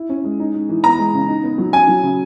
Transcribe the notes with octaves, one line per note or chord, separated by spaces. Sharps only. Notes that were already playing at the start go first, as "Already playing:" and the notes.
Already playing: E4
C#4
G#3
D#4
G#3
E3
B3 A#5
G#3
C#3
D#4
B3
F#3
C#4 G#5
F#3
C#3